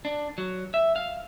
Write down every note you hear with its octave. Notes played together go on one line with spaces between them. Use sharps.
D4
F#3
E5
F5